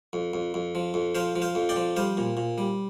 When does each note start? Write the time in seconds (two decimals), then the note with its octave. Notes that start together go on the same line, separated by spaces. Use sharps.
0.13 F2
0.34 F2
0.54 F2
0.75 F3
0.94 F2
1.15 F3 C5 F5
1.36 F3
1.42 C5 F5
1.55 F2
1.69 D5 G5
1.76 F3
1.96 G3 C5 F5
2.17 A#2
2.37 A#2
2.58 G3